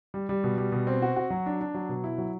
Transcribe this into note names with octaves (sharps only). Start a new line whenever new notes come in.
G3
G3
B2
G3
B2
C4
F#4
F#4
F#3
D4
D4
F#3
B2
E4
F#3